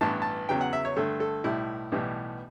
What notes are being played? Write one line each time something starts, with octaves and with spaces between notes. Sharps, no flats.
A1 G2 E3 B3 A5
A5
E2 C#3 F#3 B3 G5
F#5
E5
C#5
G2 D3 A3 A4
A4
B1 A2 G3 E4
B1 A2 E3 G3 B3